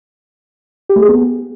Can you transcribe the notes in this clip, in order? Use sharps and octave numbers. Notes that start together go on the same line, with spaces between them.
G4
A3
G#4
B3